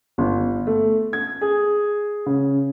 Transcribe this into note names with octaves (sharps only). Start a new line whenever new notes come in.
G1
A3
G#6
G#4
C#3